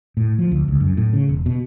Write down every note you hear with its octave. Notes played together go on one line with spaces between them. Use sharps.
A2
F3
D2
C#2
F#2
A2
C#3
E1
B2